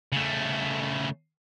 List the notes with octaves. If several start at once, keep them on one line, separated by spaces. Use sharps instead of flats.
C#3 A3